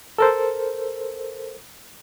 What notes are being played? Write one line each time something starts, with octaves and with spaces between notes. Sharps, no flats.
A4 A#4 C5